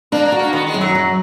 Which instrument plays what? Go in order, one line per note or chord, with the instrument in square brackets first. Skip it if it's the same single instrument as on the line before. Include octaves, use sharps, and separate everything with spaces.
[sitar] A#3 [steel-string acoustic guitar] D4
[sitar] A#3
[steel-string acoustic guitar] F#4
[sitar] A#3
[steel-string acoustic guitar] D#3 [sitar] B3
[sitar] G#3
[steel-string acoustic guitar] F#2
[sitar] F#3
[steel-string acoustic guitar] F#3